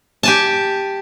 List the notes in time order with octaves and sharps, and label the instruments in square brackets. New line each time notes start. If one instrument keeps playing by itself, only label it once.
[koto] G4 G#5 A5